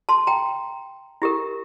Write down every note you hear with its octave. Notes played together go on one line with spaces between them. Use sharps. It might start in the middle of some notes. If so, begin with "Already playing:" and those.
A5 C6
G5 A#5
E4 G4 A#4